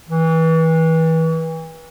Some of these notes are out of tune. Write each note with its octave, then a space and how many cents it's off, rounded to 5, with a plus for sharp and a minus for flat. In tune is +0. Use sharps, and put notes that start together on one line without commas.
E3 -30